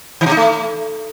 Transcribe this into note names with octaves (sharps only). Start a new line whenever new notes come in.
D#3
B2
D#4
A3